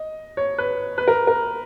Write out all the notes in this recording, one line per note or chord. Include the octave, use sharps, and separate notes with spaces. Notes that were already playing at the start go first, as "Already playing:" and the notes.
Already playing: D#5
C#5
B4
B4
A#4
A#4